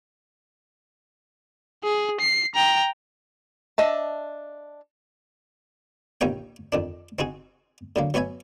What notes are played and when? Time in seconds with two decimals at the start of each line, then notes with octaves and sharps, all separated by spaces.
1.83 G#4
2.20 C7
2.55 G5 A#5
3.78 D4 D#5 E5 A5
6.21 A#1 D#2 D#4 C#5 G5
6.72 F2 D#3 D4
7.19 C4 D#4 F#4 G#4
7.96 D3 F#3 A#3
8.14 F#3 B3 C#5 E5 G#5